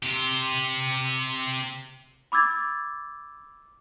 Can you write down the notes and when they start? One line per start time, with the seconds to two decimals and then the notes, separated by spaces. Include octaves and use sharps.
0.03 C3 G4
2.32 B5 D6 E6 G#6 A6